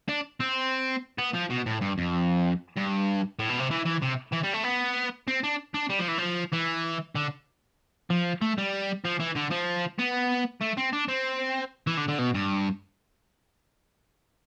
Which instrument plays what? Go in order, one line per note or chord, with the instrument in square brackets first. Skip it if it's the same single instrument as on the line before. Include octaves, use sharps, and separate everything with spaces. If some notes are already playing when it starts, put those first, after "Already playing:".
[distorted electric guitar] D4
C4
B3
F3
B2
A2
G2
F2
G2
A2
B2
C3
E3
E3
C3
E3
G3
A3
B3
C4
D4
D4
G3
F3
E3
F3
E3
D3
F3
A3
G3
F3
E3
D3
F3
B3
A3
C4
D4
C4
E3
D3
D3
B2
G2